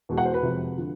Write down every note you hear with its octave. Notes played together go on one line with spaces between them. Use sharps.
E2 B2 G#3
F#5
C5
B4
F2 C3 F3 G#3
D3 F3